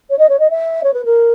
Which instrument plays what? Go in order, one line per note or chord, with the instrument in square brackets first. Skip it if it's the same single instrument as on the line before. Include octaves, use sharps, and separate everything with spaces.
[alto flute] C#5
D#5
C#5
D#5
E5
C#5
B4
A#4